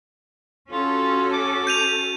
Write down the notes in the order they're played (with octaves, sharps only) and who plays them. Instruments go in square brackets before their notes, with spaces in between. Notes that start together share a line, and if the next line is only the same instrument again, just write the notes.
[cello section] C#4 F#4 A4 [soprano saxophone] F4
[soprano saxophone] D6
[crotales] G6 D#7 F7